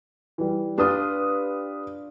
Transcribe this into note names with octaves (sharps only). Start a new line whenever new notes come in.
E3 G3
D4 F4 G4 B4 D#6